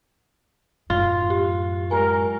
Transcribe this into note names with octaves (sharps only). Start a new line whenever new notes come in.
F#2 A2 F4
G4
G#3 G4 A#4 G#5